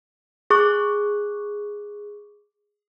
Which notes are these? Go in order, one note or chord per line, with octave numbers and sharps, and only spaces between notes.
G#4 C#6 D6 F#6